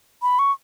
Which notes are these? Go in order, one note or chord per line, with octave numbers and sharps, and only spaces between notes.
B5
C#6